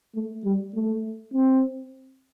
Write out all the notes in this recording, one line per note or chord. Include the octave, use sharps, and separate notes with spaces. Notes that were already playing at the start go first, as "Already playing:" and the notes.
A3
G3
A3
C4